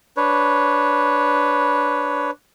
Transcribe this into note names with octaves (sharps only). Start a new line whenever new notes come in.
D4 B4 C#5